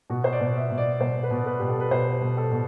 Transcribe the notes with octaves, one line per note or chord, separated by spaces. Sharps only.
B2 F#4
C5
D5
B2
E5
B2
D5
B2 C5
B4
B2
B4
B2 G4
A4
B4
B2 C5
B2
A4
B2